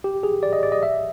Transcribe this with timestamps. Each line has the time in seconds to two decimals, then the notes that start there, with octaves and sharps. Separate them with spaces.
0.04 G4
0.23 G#4
0.43 D5
0.53 D#5
0.63 D5
0.72 D#5
0.83 E5